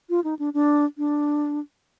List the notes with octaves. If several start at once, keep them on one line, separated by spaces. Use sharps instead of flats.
F4
D#4
D4
D4
D4